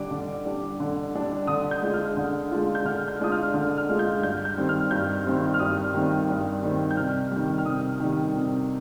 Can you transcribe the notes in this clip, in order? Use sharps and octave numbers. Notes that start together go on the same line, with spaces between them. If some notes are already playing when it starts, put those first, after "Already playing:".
Already playing: D3 G3 D4 D6
D3
G3 D4
D3
G3 D4
D3 D#6
G6
G#3 D4 F4
F6
D3
G#3 D4 F4
G6
D3 F6
G6
G#3 D4 F4 D#6
F6
D3
F6
G#3 D4 F4
G6
G2 G6
G6
D#3 G3 C4
F6
G2 G6
D#3 G3 C4
F6
G2 D#6
D#3 G3 C4
G2
D#3 G3 C4
G6
C3 F6
D#3 G3
F6
C3 D#6
D#3 G3
C3